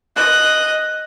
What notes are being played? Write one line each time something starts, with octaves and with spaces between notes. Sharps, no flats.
D#5 F#6